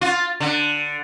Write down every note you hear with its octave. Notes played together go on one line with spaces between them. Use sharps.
F4
D3